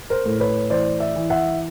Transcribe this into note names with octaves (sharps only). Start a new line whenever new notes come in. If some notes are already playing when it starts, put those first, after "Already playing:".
A#4 C5
A2
B4 C#5
E3 C5 D5
D5 E5
E3
E5 F#5